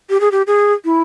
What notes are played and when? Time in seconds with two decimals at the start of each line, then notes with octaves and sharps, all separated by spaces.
0.10 G4
0.21 G#4
0.32 G4
0.47 G#4
0.85 E4